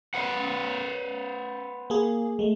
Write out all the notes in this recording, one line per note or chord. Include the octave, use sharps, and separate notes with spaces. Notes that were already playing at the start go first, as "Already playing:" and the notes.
B4 C5 F#5
A#3 G#4
G#3 A3